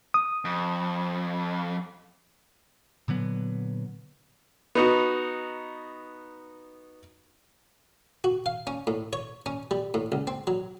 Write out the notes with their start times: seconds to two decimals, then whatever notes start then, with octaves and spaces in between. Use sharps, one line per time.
0.14 D#6
0.45 F2
3.08 A#2 D3 F#3 B3
4.75 B3 D#4 F#4
8.24 F#4
8.46 F5
8.67 C#4
8.87 A2
9.13 C#5
9.46 C#4
9.71 G3
9.94 A2
10.12 C#2
10.27 C4
10.47 F#3